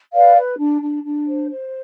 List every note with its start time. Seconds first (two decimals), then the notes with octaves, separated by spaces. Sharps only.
0.13 B4 D5 F5
0.36 B4
0.58 D4
0.81 D4
1.03 D4
1.26 C5
1.50 C5